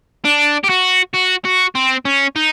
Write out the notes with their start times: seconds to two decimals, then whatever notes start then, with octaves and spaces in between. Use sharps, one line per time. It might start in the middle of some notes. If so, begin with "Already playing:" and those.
0.25 D4
0.64 G4
0.70 F#4
1.14 F#4
1.45 F#4
1.75 C4
2.05 C#4
2.36 D#4